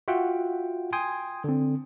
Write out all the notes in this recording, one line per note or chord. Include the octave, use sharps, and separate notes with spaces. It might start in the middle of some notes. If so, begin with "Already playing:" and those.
F4 F#4 E5 F#5 G5
G5 G#5 C6 D#6 G#6
D3 C4